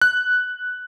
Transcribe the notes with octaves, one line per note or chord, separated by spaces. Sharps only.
F#6